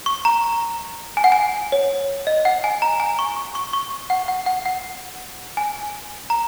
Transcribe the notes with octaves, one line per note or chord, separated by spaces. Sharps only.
C#6
A#5
G#5
F#5
G#5
C#5
D#5
F#5
G#5
A#5
G#5
C#6
C#6
C#6
C#6
F#5
F#5
F#5
F#5
G#5
A#5